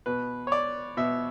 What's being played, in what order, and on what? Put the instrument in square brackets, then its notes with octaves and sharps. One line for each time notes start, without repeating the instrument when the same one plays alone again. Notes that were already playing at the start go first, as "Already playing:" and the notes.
[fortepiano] B2 B4
C#5
D5
B2 E5